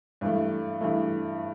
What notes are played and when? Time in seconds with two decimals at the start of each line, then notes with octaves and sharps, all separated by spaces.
0.21 G2 E3 A3
0.81 G2 E3 A3